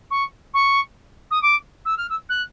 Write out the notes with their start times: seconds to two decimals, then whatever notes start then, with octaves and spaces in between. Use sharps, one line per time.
0.11 C#6
0.54 C#6
1.31 D#6
1.42 D6
1.85 E6
1.97 F6
2.09 E6
2.29 F#6